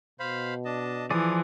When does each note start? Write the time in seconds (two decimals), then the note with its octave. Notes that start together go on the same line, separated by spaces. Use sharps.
0.20 B2 C5 F5 B5
0.65 D4 D#5 A5
1.10 E3 F3 G#4 D5 D#6